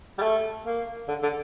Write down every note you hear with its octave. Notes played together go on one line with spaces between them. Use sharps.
G3
A3
A#3
D3
D3